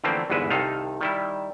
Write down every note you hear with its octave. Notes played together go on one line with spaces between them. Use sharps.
D3 E3 F3 A3 A#3 C4
G1 E2 G#2 G#3 B4 E5
C2 C3 D#3 D#4 A4 F5
D#3 G3 E4